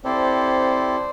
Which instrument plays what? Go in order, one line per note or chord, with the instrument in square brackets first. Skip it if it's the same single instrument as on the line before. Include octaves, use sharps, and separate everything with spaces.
[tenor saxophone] C4 [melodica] E4 G4 A4 [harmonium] C5 D5